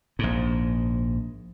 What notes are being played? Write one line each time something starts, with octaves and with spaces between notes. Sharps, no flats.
A#1 G#2